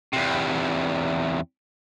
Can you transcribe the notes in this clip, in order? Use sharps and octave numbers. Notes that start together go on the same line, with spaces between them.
E2 C3